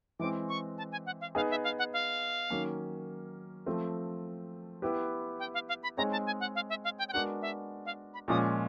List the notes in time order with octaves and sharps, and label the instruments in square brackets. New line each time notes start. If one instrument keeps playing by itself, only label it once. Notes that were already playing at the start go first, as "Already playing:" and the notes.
[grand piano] E3 G#3 C4 [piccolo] D6
[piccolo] C#6
A5
G#5
F#5
F5
[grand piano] B3 D#4 G#4 [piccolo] F5
[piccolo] E5
F5
F#5
F5
[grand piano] D#3 F#3 A#3 C#4
F3 A3 C4
B3 E4 G4 B4
[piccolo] G5
F5
F5
B5
[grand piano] G#3 C4 D#4 G#4 C#5 [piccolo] A#5
[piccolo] A5
G#5
F#5
F5
E5
F5
G5
G5
[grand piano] G#3 B3 D4 F#4 A#4 [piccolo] F#5
[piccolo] E5
F5
B5
[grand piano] A#2 F3 G#3 C#4 F4 [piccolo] D#6